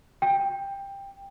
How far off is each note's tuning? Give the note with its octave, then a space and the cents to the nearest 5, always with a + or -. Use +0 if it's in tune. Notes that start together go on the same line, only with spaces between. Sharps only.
G5 +15